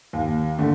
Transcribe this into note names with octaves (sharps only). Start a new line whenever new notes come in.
D#2
D3 A3